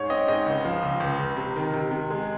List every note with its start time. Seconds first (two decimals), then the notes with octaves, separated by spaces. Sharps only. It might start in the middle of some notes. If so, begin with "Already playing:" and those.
Already playing: G#2 C#5
0.10 C4 D#5
0.28 G#2 D#5
0.46 C#2
0.65 F3
0.83 C#2
1.00 C#2
1.20 C#2
1.37 C3
1.56 D#3
1.74 C3
1.91 C3
2.10 G#3